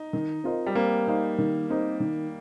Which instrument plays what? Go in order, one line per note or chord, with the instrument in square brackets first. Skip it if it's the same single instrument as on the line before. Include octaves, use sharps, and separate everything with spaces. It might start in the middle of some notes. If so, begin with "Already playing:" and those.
Already playing: [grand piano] D#4
[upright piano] D#3
C4 F4 A#4 D#5
[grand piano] G3
[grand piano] A#3 [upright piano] C4
[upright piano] D#4 C5 F5
D#3
C4 D#4 A#4
D#3